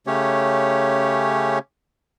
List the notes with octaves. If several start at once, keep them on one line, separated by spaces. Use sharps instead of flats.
C#3 A3 C#4 G4 C#5